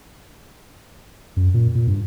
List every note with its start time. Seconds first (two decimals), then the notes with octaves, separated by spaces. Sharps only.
1.36 F#2
1.54 A#2
1.75 A#2
1.87 G2